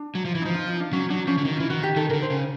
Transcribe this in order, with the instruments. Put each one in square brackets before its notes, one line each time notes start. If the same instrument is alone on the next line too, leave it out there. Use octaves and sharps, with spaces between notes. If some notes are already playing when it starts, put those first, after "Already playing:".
Already playing: [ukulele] D4
[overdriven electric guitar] F#3
F3
E3
[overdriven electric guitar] F3 [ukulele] D#4
[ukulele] F4
D#4
D4
[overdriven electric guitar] F#3 [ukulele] C#4
[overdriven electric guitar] F#3 [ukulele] D4
[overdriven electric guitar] F3 [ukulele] C#4
[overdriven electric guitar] D3
D#3
[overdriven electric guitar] E3 [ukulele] F4
[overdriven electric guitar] D#3 [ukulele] F#4
[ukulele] G4
[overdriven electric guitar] D#3 [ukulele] A4
[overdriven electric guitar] D3 D#3 [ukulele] A#4
[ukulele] C5
[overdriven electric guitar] C#3